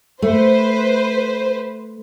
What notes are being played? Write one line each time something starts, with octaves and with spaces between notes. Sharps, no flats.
A3 B4 C5